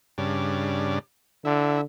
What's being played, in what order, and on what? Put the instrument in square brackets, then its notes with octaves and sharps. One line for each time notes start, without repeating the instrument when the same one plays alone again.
[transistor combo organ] G2 C#3 D4
[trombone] D3 [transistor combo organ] E4